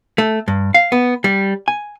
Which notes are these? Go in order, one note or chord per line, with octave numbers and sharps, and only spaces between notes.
A3
G2
F5
B3
G3
G#5